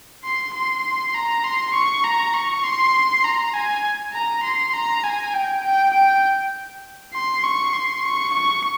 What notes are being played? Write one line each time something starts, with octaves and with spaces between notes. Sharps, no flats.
C6
C6
A#5
C6
C#6
A#5
C#6
C6
A#5
G#5
A#5
C6
A#5
G#5
G5
G5
G5
C6
C#6
C6
C#6
C#6